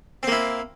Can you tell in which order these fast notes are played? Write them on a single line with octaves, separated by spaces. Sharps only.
C4 A#3 E4